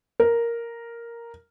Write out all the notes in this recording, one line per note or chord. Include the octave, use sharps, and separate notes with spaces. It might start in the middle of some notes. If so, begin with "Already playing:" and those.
A#4